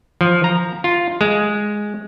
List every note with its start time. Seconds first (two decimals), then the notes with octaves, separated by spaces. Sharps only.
0.21 F3
0.44 A#5
0.84 F4
1.21 G#3